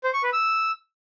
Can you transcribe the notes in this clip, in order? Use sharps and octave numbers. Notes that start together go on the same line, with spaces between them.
C5
C#6
B4
E6